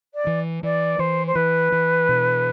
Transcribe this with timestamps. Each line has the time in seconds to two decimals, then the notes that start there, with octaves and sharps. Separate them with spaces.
0.14 D5
0.27 E3
0.63 E3 D5
0.99 E3 C5
1.27 C5
1.35 E3 B4
1.72 E3
2.09 B2